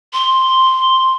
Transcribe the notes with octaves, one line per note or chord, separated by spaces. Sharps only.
C6